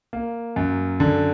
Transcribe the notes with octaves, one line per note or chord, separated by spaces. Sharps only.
A#3
F#2
D3